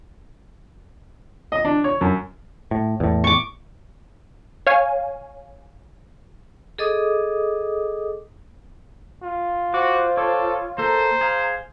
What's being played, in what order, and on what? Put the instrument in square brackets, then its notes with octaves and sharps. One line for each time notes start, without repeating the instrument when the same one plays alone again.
[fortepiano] D#5
D4
C#5
F#2
[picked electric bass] A2
E2 A2
[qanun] C#6 D6
[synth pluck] C#5 F5 G#5
[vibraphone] G#4 A4 D#5 D6 D#6
[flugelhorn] F4
[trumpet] F#4 [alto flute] C5 [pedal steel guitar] D6
[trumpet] A4 [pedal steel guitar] C#5 D6
[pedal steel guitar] A#3 A4 [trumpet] C5 [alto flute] A#5
[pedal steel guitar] G#4 F5